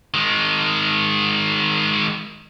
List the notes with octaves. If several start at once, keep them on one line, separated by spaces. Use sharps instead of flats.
D#3 G#3